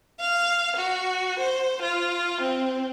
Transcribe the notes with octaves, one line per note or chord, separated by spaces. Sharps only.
F5
F#4
C5
F4
C4